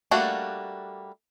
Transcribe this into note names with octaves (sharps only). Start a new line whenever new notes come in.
G3 A3 A#3 D4 F#4